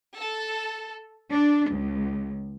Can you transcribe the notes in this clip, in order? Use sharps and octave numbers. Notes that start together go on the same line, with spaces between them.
A4
D4
C#2